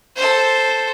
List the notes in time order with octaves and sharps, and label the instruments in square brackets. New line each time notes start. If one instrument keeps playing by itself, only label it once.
[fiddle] A4 C5